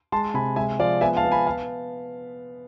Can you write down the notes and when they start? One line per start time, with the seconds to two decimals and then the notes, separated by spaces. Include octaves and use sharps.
0.12 G#3 A5 C6
0.34 C3 G#5 B5
0.56 G#3 E5 G#5
0.79 F3 D5 F5
1.01 B3 E5 G#5
1.16 F5 A5
1.24 B3
1.32 G#5 B5
1.47 F5 A5